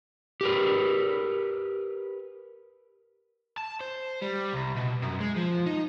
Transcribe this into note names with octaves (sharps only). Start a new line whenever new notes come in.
G4 A#4 B4
A5
C5
G3
C2
B2
F#2
G#3
F3
D#4